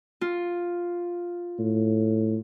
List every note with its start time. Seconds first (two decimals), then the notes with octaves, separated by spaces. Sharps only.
0.21 F4
1.59 A2